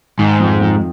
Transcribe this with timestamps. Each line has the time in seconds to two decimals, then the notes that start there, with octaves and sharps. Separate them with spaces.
0.19 G#2 D#3
0.40 F2
0.60 F2